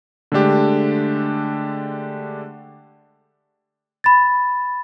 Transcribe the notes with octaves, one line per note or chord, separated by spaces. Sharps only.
D3 G#3 A3 D4 G4
B5 A6